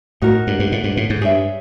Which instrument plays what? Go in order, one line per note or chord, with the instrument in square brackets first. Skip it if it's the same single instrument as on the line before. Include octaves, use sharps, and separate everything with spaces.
[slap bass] A2 [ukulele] D#4 F#4 A#4
[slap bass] G2
G2
A2
G2
A2
G#2
[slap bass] G2 [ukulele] G#4 C#5 E5